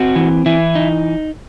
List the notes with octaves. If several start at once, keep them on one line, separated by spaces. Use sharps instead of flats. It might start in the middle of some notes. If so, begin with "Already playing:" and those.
Already playing: C4 F#4
E3
E3 E4
D#4